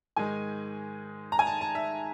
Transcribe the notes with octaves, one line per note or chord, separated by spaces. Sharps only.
G#2 D#3 G#3 G#5
A#5
G#5
A5
A5
E5